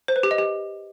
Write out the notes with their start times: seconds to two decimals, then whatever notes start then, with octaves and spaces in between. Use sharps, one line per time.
0.08 C5
0.16 B4
0.23 G4
0.31 D#5
0.38 G4